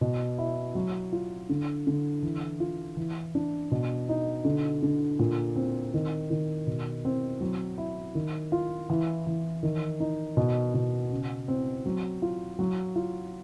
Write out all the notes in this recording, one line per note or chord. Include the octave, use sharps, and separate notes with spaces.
B2
E4
F#3
F4
D3
D3
E3
F4
E3
D4
B2
D#4
D3
D3
A#2
C4
D#3
D#3
B2
C4
F#3
E4
D#3
F4
E3
E3
D#3
D#4
B2
B2
C#3
C4
F#3
F4
F#3
F4